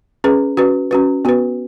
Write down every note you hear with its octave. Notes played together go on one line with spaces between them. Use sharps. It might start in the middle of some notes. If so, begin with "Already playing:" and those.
C#4 G#4 B4
C#4 F#4 B4
C#4 F#4 B4
B3 F#4 B4